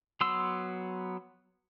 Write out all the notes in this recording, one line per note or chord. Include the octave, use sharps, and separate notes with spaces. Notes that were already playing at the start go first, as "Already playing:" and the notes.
F#3 B3 C6 E6